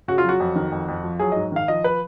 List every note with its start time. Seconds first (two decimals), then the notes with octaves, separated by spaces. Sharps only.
0.08 C#3 F#4
0.18 F4
0.24 F#3 F#4
0.40 F2
0.56 D#3
0.72 F2
0.88 F2
1.03 F3
1.19 F#3 G#4
1.32 G#2 D#5
1.52 D#3 F5
1.68 F3 D#5
1.84 B4